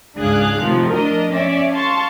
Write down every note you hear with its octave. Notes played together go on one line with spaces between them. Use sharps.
C#2 G#2 D4 G#4 F5 F#6
A2 C3 D#3 F3
F3 D4 A#4 D#5
C#4 D5 E5
F5 A5 C6 C#6